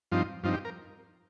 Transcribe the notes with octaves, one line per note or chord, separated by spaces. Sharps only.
G2 F3 C4 D#4 F4
G2 F3 C4 D#4 F4
G4
A#4